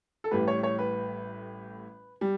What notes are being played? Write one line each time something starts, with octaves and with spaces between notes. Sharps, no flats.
A4
A1 A2 G3 B4
C#5
C#5
B4
G3